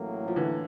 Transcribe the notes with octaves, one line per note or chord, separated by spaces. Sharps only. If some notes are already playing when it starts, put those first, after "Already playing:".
Already playing: A1 A2 F#3 A#3
F3
D3 E3